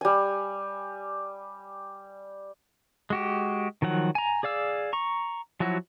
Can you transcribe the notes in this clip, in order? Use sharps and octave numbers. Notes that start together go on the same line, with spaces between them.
G3 G#5
G#3 F#4 G4
D#3 F3 F#3 F#5
G#5 A#5
G#4 D5 F5 E6
A#5 C#6
F3 F#3 E4 F#4